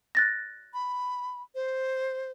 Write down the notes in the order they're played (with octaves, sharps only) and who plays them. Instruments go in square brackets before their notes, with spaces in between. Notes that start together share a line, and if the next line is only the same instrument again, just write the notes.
[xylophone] F#6 A6 A#6
[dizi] B5
C5